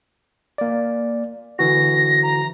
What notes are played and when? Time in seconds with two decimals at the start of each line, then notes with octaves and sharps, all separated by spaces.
0.58 A#3 D5
1.59 D3 E3 F#4 A#6
2.23 A#5